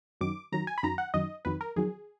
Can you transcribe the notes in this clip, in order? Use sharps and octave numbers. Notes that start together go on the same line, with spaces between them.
F#2 D#3 F#3 D6
F#2 D#3 F#3 A#5
G#5
B5
F#2 D#3 F#3 A#5
F#5
F#2 D#3 F#3 D#5
F2 D#3 F#3 B4
A#4
F2 D#3 F#3 G#4